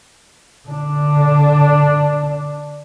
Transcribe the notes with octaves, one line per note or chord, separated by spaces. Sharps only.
D3 D4